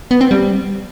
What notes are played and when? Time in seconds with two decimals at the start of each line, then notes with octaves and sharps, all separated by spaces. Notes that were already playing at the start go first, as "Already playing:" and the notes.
0.11 B3
0.21 C4
0.31 G3